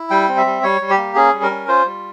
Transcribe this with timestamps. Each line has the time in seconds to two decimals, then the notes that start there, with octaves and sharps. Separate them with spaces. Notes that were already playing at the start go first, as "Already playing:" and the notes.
Already playing: E4
0.11 G3 G5
0.28 C4
0.37 E5
0.46 G3
0.63 G3 C#5
0.81 G3
0.90 G4
0.98 A#3
1.15 C#4 G#4
1.33 G3
1.42 A#4
1.51 C#4
1.68 F4 C5
1.85 G3